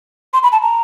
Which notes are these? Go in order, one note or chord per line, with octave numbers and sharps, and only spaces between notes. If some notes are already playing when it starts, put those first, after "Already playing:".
C6
B5
A5
A#5